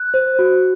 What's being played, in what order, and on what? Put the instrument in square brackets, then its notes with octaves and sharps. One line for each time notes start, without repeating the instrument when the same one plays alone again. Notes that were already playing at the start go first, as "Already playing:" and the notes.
Already playing: [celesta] F#6
C5
F#4